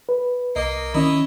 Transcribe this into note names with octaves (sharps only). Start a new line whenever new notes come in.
B4
C2 A#3 D#5
D#3 C#4 E4 C#5 D#5